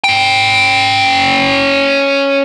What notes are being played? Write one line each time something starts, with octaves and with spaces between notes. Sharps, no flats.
C#4 G5